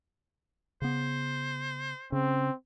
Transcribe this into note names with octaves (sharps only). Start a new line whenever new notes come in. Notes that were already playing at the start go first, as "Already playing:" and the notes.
C#3 B3 C5
C#3 C4